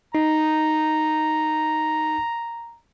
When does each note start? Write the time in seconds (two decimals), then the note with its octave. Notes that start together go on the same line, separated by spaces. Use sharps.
0.15 D#4 A#5